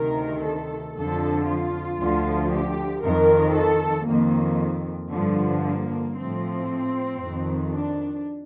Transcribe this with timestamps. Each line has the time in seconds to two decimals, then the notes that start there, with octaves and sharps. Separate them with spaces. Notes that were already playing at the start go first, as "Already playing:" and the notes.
Already playing: D2 C3 D#3 A#4
0.45 A4
0.97 F2 D3 F3 A4
1.48 F4
2.00 D2 D3 F3
2.52 G4
3.04 F2 D#3 A#4
3.56 A4
4.08 F2 D#3 A#3
5.11 G2 D3 F3
5.63 A#3
6.15 A2 F3 C4
7.19 F2 D#3
7.71 D4